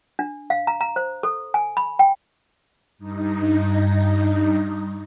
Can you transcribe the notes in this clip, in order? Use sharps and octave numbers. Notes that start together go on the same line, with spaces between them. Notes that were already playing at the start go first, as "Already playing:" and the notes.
D4
F5
A#5
A#5
C5
A4
G#5
B5
G5
G2 D#4